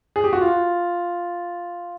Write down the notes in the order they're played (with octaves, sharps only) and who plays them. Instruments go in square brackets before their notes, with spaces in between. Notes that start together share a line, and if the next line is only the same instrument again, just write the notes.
[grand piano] G#4
G4
F#4
F4